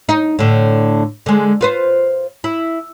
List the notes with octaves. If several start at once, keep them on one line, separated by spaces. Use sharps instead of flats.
D#4
A2 D3
D3 G#3
F4 B4 C5
E4